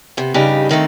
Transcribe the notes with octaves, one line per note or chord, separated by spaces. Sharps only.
C3 B3
G2 C#3 D4 D#4 G4
D3 D#3 A3 C4